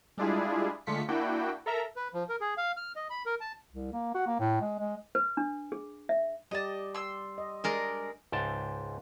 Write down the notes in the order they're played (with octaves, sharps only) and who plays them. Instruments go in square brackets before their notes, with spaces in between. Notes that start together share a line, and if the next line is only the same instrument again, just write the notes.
[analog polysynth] G3 G#3 D4 E4 F4 G#4
D3 G#3 A3 F4 B6 C#7
A#3 D4 E4 F#4 G5
A4 A#4 E5 A#5
[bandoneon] B4
F3
A#4
G#4
F5
F6
D#5
B5
A#4
A5
[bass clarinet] C2
A#3
F#4
A#3
A2
G#3
G#3
[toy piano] B4
D4
G#4
E5
[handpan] G3 G4 D5 [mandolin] D#5 A5
[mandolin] C6 E6
[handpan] D#5
[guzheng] G#3 A#4 D5 [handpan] D4
[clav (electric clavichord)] C#2 G#2 G5 A5